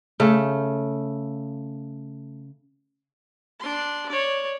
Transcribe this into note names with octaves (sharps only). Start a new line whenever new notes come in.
C#3 A3
D4 C6
C#5 D5